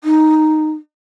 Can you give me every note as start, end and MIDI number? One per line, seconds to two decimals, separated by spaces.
0.04 0.69 63